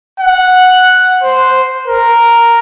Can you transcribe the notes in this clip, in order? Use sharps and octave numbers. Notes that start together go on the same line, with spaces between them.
F#5
C5
A#4